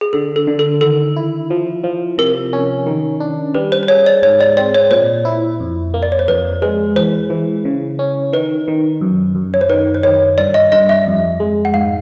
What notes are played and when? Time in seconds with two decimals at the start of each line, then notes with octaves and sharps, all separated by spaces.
0.01 G#4
0.13 D3 A4
0.36 A4
0.47 D3
0.59 A4
0.81 D#3 A4
1.16 E4
1.50 F3
1.84 F3
2.18 C3 A#4
2.53 C#4
2.86 D#3
3.20 D4
3.54 G3 B4
3.72 C5
3.83 C5
3.88 G#4 C#5
4.06 D5
4.23 G#2 C#5
4.41 D5
4.57 C4 D5
4.74 C#5
4.91 A#2 C5
5.25 E4
5.60 F2
5.94 A#3
6.03 D5
6.12 C#5
6.19 C5
6.28 F2 B4
6.62 G#3 B4
6.96 E3 C5
7.30 E3
7.65 C#3
7.99 C#4
8.33 D#3 B4
8.68 D#3
9.01 F#2
9.35 F#2
9.54 C#5
9.61 C5
9.69 D#3 B4
9.95 C5
10.03 D#3 C#5
10.38 G2 D5
10.54 D#5
10.72 G2 D#5
10.89 E5
11.07 F2
11.40 G#3
11.65 F#5
11.74 G#2 F5